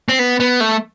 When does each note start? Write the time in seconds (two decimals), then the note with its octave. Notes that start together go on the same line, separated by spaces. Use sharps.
0.09 C4
0.19 B3
0.40 B3
0.61 A3